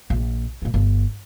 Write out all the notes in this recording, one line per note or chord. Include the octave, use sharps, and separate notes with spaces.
A#1
A#2 A3
G1